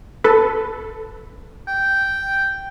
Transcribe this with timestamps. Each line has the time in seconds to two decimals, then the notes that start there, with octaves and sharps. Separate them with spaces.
0.24 A4 B4
1.68 G5